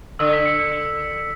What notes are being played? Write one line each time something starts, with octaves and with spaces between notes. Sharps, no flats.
D3 E6
B6
C#7
C#7
C#7